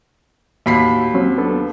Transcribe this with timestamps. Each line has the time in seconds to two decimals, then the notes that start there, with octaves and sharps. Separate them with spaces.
0.66 D#2 A2 F#4 B5 B6 C7
1.14 F#3 C4 C#4
1.38 B3 D4 A4